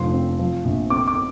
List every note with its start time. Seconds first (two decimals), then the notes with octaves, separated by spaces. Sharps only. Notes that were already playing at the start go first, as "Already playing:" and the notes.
Already playing: F1 D3 F3 C6
0.14 C4
0.39 F3
0.64 A#1
0.90 C4 D6
1.08 D6